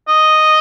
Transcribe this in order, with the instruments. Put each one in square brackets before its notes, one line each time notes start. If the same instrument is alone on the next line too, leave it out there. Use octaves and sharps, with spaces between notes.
[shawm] D#5